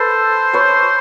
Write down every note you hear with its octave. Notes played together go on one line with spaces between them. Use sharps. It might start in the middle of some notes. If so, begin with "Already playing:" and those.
Already playing: A4 B4 C5
B4 C#5